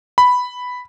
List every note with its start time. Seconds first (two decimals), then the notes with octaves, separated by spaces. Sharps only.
0.18 B5